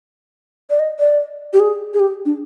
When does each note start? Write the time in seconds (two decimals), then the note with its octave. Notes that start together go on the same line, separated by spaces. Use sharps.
0.70 D5
0.79 D#5
0.99 D5
1.53 G4
1.60 G#4
1.94 G#4
2.00 G4
2.25 D4